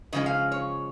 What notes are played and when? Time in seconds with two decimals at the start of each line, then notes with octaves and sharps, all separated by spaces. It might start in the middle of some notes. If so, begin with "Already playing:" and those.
0.13 C#3 F3 G#3 C#4 D#5
0.26 F5
0.52 C#5